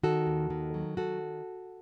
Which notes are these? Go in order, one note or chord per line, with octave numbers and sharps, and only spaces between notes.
D#3 F#4 A4
D#2
D#3
F#3
D#3 F#4 A4